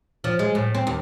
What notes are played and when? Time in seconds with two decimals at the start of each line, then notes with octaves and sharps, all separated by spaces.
0.24 F3
0.39 G#3
0.55 A2
0.75 C4
0.87 D#2